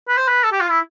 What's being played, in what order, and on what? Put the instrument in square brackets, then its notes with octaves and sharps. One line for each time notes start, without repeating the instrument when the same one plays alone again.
[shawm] B4
C5
B4
A4
G4
F4
E4